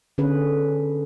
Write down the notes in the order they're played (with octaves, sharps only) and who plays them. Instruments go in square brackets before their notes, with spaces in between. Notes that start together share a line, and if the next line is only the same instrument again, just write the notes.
[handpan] D3 C#4 G#4 B4